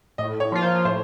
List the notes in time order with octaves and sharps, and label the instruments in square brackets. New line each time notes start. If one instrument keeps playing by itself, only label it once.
[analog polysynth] A2 [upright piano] D#5
[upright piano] C#5
[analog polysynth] F3 A#3 F4
[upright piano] C5
[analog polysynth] A2 [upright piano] C5